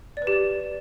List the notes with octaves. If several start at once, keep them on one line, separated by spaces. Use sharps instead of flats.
D5
B4
G4
D5